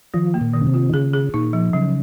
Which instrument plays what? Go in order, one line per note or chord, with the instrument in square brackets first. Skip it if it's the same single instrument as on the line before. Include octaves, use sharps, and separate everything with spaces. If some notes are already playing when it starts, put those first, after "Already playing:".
[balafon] D#3 [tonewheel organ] F3
[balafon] A#3
[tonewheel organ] A#2
[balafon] D#3
[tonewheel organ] C#3
C3
[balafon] F4
[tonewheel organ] D#3
[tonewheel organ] C#3 [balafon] G#4
[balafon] G#4
[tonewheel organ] A#2 [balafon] D#4
[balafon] F3
[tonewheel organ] C#3 [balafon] F#3